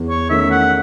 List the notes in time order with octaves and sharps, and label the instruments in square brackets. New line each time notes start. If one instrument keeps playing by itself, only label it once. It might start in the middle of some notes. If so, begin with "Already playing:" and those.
Already playing: [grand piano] E2
[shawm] C#5
[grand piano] D#3 A3 C#4 [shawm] E5
[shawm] F#5